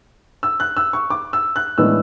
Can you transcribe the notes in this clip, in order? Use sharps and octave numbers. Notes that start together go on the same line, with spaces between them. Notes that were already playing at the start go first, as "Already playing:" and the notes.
E6
F#6
E6
C#6
D6
E6
F#6
A2 E3 G#3 B3 D4 E6